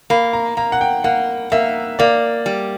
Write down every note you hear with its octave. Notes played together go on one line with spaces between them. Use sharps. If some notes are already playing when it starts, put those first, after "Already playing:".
A#3 B5
A#5
A#3 A#5
F#5
G5
A#3 F#5
A#3 E5
A#3 D5
G3